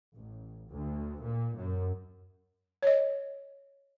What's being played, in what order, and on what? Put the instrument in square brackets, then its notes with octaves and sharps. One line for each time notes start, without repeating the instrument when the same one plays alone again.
[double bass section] A1
D2
A#2
F#2
[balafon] C#5 D#5